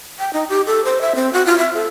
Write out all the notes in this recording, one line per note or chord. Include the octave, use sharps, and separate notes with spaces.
G5
D#4
G4
A4
C5
E5
C4
F#4
F4
E5
A4